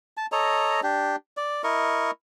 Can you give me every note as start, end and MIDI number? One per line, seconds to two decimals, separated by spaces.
0.17 0.26 81
0.32 0.80 69
0.32 0.80 73
0.32 0.80 75
0.32 0.80 82
0.83 1.16 62
0.83 1.16 67
1.37 1.62 74
1.64 2.11 64
1.64 2.11 70
1.64 2.11 75
1.64 2.11 85